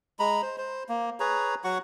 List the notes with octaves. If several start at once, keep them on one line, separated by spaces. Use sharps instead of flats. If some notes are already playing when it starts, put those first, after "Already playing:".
G#3 A#5 B5
C5
C5
A#3
G#4 B4 C#5 A#5
F#3 F#4 F#5 C#6